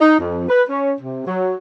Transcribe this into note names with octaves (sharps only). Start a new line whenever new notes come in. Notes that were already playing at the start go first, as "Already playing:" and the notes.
D#4
F2
B4
C#4
C3
F#3